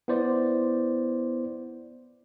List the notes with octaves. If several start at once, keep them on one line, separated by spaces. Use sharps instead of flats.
B3 E4 C5 D5